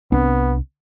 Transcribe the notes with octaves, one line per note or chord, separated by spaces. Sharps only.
C2 B3 C4 D4